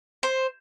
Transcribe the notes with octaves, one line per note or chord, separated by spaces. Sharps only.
C5